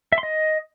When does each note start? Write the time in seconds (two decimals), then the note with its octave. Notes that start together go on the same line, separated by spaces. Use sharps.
0.12 E5
0.18 C6
0.23 D#5